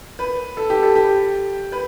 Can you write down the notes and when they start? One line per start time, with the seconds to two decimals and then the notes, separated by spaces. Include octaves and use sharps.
0.19 B4
0.57 A4
0.70 G4
0.83 A4
0.95 G4
1.72 B4